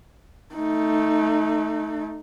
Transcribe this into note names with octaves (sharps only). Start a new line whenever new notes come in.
A3 D#4